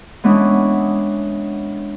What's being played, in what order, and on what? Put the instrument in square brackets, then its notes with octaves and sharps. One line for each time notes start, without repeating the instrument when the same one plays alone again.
[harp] E3 G#3 B3 C#4 D4